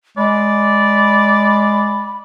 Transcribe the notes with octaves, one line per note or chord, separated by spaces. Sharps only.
G#3 D5 B5